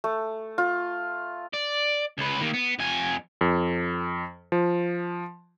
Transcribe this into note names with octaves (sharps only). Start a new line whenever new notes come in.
A3
F4
D5
C#2 B4
D#3 A#3
B3
F2 G#5
F2
F3